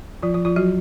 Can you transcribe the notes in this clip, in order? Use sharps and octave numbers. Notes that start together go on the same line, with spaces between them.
F3 F4
F3 F4
F3 F4
F#3 F#4